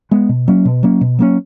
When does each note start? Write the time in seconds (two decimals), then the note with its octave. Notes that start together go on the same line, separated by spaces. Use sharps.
0.11 G#3 B3
0.29 B2
0.48 F#3 A#3 C#4
0.65 B2
0.83 F#3 A#3 C#4
1.01 B2
1.19 F#3 A#3 C#4